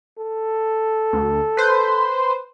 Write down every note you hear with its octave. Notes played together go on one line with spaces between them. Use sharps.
A4
D2
B4 C5